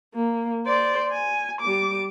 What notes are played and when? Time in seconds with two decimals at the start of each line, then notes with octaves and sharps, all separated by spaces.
0.14 A#3
0.66 C5 D5
1.12 G#5
1.61 G3 D6